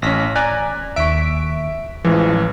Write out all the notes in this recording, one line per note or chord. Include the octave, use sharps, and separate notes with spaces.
A1 C#4 A#6 B6
D5 G#5 A#5 F#6
D#2 E5 C#6 B6 D7
A1 E3 F3 G#3